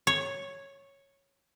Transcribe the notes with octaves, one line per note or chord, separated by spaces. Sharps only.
C#5